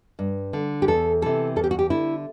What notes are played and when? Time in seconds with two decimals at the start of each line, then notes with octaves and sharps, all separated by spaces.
0.19 G2
0.53 D3
0.82 G4
0.88 E2 A4
1.22 C3 E3 A4
1.56 E2 A4
1.64 G4
1.71 F#4
1.79 G4
1.90 D3 E4